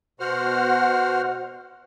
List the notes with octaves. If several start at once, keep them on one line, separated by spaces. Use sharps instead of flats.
B2 F#4 C5 F#5 F6